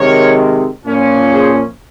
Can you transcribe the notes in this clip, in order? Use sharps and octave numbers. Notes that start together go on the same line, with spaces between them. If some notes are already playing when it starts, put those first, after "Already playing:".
Already playing: C3 D#3 G#3 A#4 C#5
A#2 F3 A#3 C#4
G#4 C5